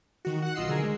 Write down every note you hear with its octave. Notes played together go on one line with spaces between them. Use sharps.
D#3 F#4
F#5 F#6
B1 F4 D#5 E6 C7
D3 G#4 A#4
G#3